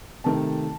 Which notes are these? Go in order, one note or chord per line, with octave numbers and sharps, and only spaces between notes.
C3 D#3 A3 A5